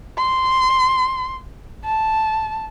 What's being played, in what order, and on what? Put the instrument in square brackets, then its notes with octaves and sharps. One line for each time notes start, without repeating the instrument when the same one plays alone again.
[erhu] C6
A5